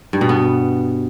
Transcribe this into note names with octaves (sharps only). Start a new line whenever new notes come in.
G2
B2
B3